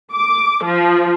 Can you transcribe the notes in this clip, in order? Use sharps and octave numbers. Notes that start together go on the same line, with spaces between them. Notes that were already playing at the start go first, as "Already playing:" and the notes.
D6
F3